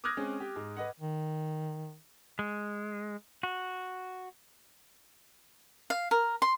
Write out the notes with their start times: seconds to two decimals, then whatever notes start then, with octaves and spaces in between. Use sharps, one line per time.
0.04 D6 D#6 F6 F#6 G#6 A#6
0.17 G#3 C4 C#4
0.40 G4
0.56 G#2
0.77 B4 D#5 F#5
1.00 D#3
2.39 G#3
3.43 F#4
5.90 F5
6.11 A#4
6.42 C6